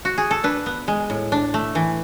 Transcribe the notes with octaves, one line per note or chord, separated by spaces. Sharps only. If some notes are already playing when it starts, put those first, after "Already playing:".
F#4
G#4
A4
D4 B4
B3
G#3
A2
D4
A3
E3